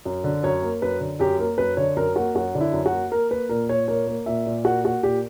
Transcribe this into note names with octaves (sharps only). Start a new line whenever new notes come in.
F#2
D3
F#2 C#5
A#3
F#2 B4
D3
F#2 G4
A#3 A#4
F#2 B4
D3 C#5
F#2 A#4
A#3 F#4
F#2 F#4
D3
E4
F#2
F#4
A#3
A#3 A#4
A#3 B4
A#2 A#4
A#2 C#5
A#3 C#5
A#3
A#2 E5
A#2
A#3 F#4
A#3 F#4
A#2 G4